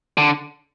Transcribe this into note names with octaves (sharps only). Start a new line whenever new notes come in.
D3